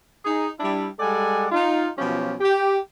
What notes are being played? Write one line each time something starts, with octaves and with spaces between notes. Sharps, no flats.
D#4 G#4
G3 D4 E4
G3 G#3 A4 D5 F#5 G#5
D#4 F4
B2 F3 F#3 C#4 F4 G4
G4